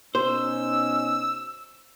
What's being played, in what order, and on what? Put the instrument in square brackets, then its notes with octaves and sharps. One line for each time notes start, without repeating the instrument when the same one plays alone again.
[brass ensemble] B2 C#4 D#4 [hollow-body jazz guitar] C5 [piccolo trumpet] E6